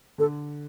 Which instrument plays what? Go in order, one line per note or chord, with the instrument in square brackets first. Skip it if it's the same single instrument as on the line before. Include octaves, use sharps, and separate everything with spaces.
[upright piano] D3 [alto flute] A4